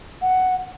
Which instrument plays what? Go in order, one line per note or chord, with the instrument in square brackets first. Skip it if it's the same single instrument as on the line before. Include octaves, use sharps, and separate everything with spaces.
[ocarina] F#5